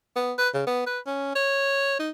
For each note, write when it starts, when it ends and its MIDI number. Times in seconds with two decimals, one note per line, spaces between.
0.16 0.33 59
0.38 0.49 71
0.54 0.63 49
0.67 0.84 59
0.86 0.99 71
1.06 1.32 61
1.35 1.98 73
1.99 2.10 63